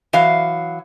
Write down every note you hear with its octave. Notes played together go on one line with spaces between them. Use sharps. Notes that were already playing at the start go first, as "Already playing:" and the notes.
E3 F#3 F5